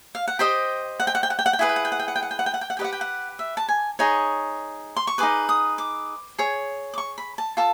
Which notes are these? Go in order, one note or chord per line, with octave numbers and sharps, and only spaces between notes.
F5
F#5
G4 C5 D#5 G5
F#5
G5
F#5
G5
F#5
G5
F#5
G5
E4 G#4 B4 F#5
G5
F#5
G5
F#5
G5
F#5
G5
F#5
G5
F#5
G5
F#5
G5
F#5
G4 B4 D#5 G5
F#5
G5
F#5
E5
A5
G#5
D#4 G#4 C#5
C6
C#6
D#4 G#4 B4 D6
D#6
D6
G#4 C#5
D6
C#6
B5
A5
F4 A4 A5